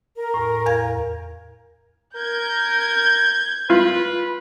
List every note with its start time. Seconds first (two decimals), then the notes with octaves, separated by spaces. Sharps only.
0.17 A#4
0.34 E2 A2
0.66 E2 F5 G#6
2.16 A#4 G6 G#6
3.70 F4 B4